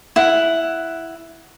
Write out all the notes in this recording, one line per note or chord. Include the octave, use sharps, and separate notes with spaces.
E4 F#5